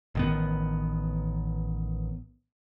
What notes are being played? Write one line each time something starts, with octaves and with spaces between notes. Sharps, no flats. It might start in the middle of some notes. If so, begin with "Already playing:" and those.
A1 D#3 B3